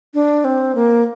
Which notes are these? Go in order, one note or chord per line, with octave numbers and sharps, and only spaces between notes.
D4
C4
A#3